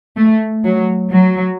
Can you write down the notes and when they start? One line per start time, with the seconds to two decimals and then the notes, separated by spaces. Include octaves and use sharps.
0.16 A3
0.65 F#3
1.12 F#3